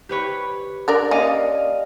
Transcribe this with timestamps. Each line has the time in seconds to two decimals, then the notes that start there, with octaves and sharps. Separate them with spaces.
0.09 G4 B4 C#5
0.88 D4 A#4 D5
1.11 A#3 C#4 D5 D#5 F5